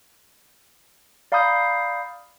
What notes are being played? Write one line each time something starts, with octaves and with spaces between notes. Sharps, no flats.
D5 F5 A#5 B5 D#6 G6